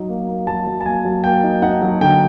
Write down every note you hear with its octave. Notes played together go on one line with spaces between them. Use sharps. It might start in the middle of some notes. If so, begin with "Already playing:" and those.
Already playing: F#3 D#4
A#3
A#3
F#3 A5
F#3
A5
A#3 G#5
F#3
A#3 G5
D#4
D#4 F#5
F#3
D3 G5